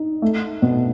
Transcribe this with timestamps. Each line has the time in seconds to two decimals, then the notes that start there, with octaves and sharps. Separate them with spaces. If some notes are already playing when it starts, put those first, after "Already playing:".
Already playing: D#4
0.22 A3
0.62 B2